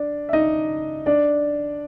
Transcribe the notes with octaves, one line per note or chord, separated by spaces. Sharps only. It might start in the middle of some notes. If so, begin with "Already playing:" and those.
Already playing: D4 D5
E5
D#4 D#5
D4 D5